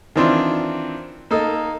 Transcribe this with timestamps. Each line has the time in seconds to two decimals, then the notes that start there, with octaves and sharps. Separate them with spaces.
0.16 D#3 E3 C4 D4 E4 F4
1.31 A#3 D#4 A4